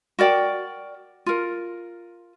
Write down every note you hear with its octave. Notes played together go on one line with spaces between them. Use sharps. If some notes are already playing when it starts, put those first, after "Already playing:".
F#4 A#4 D5 G5
F4 A#4